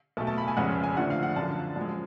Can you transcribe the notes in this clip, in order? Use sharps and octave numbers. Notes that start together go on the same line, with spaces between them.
B1 B2 A3 A5
A5
B5
G#5
F1 F2 C#3 G#3 F#5
G#5
F2 D3 F3 A3 F#5
F5
F#5
F#2 D3 F3 A5
F#2 F3 G#3